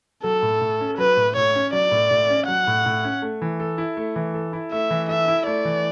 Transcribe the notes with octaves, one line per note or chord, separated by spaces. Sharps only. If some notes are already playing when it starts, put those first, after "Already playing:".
F#3 A4
A2
A2
C#4
F#3 B4
A2
A2 C#5
C#4
F#3 D5
A2
A2
C#4
F#3 F#5
A2
A2
C#4
A3
E3
A4
E4
A3
E3
A4
E4
A3 E5
E3
A4 E5
E4
A3 D5
E3